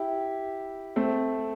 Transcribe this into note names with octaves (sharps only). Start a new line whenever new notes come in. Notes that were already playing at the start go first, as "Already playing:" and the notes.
Already playing: E4 G4
A3 C4